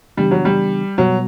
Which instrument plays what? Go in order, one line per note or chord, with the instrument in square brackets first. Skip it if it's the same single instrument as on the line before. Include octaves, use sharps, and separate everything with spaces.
[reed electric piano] C#3 E3 B3 D4 [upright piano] G3
[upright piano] F#3
G3
[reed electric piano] B2 G3 B3 F#4 [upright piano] F#3